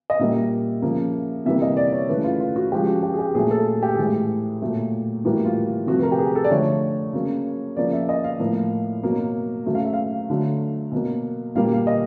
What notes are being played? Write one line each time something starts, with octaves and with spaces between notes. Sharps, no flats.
D#5
A#2 G3 A#3 E5
C#3 F3 A#3
C3 E3 G3 A#3 E5
D#5
D5
C#5
C#3 E3 A3 B4
F4
F4
F#4
C#3 F3 G#3 G4
F#4
G4
G#4
G4
A#2 F#3 A3 G#4
A4
G4
A2 E3 G#3 G#4
G4
A#2 F#3 A3
A2 E3 G3 A#3 F#4
F4
F4
C3 F3 A3 F#4
B4
A#4
G4
G#4
A4
D5
D3 F3 A3 C#5
C#3 F#3 A#3
C#3 F3 A#3 D5
E5
D#5
F5
A2 F3 A#3
B2 F#3 A#3
C#3 F#3 A3
F5
E5
F5
D3 F#3 A3
B2 F#3 A#3
A#2 G3 A#3 F5
F5
D#5